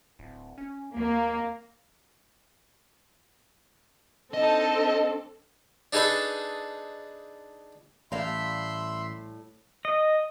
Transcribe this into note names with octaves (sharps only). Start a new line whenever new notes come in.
D1
C#4
D#2 A#3
C4 D4 D#4 A4 D#5 A5
D4 D#4 G#4 A4 B4 G#5
A1 A2 G3 E5 F5 B5 C6
D#5